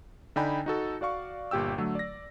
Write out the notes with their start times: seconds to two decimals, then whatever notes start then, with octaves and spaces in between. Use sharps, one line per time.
0.36 D3 D4 D#4 G5 G#5 B5
0.66 D#4 F#4 A4
1.01 F#4 D5 F5 C#6
1.51 G1 A#2 G4 G5 E6
1.78 D3 F#3 A3
1.95 D5 A#6